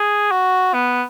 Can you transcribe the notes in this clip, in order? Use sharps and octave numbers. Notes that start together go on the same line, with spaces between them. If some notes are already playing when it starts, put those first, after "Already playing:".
Already playing: G#4
F#4
B3